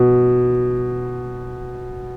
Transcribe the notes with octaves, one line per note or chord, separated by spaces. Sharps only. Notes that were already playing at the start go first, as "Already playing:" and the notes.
Already playing: B2